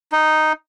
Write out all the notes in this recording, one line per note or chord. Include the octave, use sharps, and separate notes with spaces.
D#4